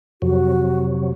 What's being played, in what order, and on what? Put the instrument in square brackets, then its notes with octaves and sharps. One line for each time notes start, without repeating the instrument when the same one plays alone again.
[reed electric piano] F2 [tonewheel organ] C3 F#3 [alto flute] F#4